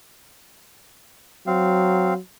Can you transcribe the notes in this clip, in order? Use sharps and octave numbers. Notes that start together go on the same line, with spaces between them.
F#3 C4 F5